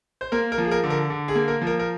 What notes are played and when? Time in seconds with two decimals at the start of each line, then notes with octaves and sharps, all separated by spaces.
0.21 C5
0.32 A#3 A#4
0.52 A#4
0.58 F3
0.65 G#4
0.71 A#4
0.84 D3
0.90 A#4
1.10 D3
1.28 G#4
1.35 A#3
1.48 A#4
1.61 F3
1.67 A#4
1.79 A#4